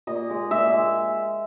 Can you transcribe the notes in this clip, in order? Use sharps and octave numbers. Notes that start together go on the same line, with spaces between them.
A#2 D#5
G#3
A#2 E5
G#3